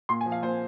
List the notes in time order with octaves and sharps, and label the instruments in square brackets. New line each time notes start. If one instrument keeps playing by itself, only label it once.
[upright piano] A#2 C6
G#5
F3
F5
A#2 C5